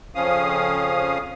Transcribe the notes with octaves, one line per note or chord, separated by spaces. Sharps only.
F2 C#3 F3 C#4 F5 D#6